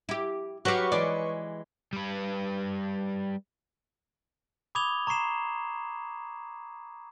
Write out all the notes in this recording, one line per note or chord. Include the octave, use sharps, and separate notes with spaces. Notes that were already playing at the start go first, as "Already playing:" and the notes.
E4 G4
F#3 F#4 G4 B4 F5 C#6
E3 G#3 D5
G3 B4
B5 D6 D#6 G#6 F7 G7
A#5 C#6 D6 C7 E7